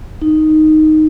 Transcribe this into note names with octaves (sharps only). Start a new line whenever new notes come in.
D#4